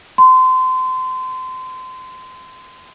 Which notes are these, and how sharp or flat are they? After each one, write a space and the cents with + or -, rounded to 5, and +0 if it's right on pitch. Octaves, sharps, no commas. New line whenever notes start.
C6 -30